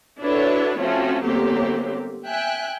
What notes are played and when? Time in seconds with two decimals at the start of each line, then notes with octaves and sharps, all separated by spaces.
0.20 D4 E4 F#4 A4 B4 C#5
0.79 F3 A3 C4 C#4 F#4
1.24 G1 F#3 A#3 C4 G4
2.26 E5 G5 G#5 F#6